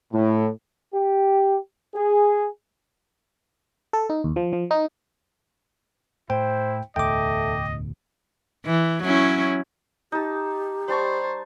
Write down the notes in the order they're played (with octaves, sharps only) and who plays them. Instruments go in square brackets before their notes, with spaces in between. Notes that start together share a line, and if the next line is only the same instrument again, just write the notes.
[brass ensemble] A2
[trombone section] G4
G#4
[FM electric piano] A4
D#4
D#2
F3
F3
D#4
[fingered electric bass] A2 [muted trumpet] E4 [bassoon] C5 [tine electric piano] G5
[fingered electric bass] E1 D2 A2 [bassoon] A3 [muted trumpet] D#5 [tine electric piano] G5 D6
[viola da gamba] E3
F#3 C#4 E4
[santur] D#4 A5 [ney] G4
[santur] G3 A5 C#6 [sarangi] C5